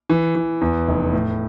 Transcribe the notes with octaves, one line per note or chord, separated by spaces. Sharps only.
E3
E3
E2
F1
A2